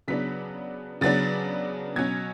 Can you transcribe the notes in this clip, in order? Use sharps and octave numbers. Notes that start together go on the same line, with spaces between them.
C#3 F#3 B3 D4 B6
C#3 F#3 B3 D4 A6
B2 F#3 C#4 G#6